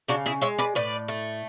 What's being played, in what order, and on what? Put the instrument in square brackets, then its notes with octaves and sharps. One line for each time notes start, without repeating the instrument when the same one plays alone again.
[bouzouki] C#3 D4 F#4
E4 G#4
G#3 C#5 E5
B4 D5
A2 B4 D5
A3